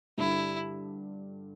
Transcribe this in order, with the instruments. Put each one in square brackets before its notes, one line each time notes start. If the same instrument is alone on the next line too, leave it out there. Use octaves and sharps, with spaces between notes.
[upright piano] G2 D3 G3 [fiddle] E4